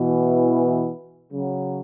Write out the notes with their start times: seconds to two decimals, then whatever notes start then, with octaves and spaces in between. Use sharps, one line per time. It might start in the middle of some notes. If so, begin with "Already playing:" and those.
Already playing: B2 E3
1.32 C#3 F#3